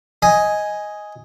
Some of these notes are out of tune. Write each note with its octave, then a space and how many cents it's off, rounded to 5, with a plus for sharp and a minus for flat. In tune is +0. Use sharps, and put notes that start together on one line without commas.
D#5 +10 G#5 +0